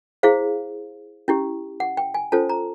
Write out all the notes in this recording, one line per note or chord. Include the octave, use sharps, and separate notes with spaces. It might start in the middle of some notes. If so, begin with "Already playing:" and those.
E4 G#4 C5 F5
C#4 E4 G4
F#5
G5
G#5
C#4 F4 A4 C5 A5
A#5